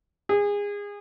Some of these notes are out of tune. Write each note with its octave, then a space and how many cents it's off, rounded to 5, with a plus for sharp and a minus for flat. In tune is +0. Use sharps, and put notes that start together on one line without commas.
G#4 -25